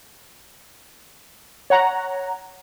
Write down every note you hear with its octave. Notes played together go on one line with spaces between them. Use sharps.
C#5 F#5 A#5